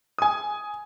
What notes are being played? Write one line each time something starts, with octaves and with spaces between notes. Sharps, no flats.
G#5 D#6